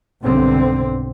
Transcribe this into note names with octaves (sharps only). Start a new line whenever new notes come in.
B1 G2 D3 C4